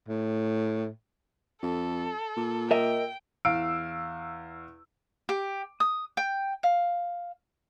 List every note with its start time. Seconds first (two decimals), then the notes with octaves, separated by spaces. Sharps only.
0.08 A2
1.62 F2 A4
2.36 A#2
2.71 A#4 D#5 E5 G5
3.45 E2 F5 E6 D7
5.29 G4
5.80 D#6
6.17 G5
6.63 F5